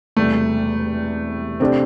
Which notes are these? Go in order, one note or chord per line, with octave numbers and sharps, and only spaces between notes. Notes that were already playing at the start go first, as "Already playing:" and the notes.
E1 E2 C3 G3 A3
C3 A3 C4 D4 G4